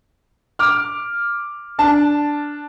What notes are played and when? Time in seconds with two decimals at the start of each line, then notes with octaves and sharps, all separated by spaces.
0.59 D6 F6
1.79 D4 A5